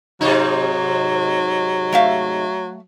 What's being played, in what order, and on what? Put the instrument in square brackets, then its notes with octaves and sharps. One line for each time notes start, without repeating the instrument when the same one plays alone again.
[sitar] G#2 C3 D#4 [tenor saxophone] F#3
[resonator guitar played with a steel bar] A3 E5 F5